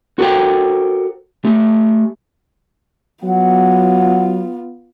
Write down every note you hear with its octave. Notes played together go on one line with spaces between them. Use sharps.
F#4 A4 A#4 C5 G5
A3 G4
F#3 B3 F4 F#5